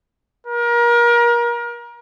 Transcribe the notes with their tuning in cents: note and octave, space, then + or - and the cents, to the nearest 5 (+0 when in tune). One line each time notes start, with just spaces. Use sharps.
A#4 +30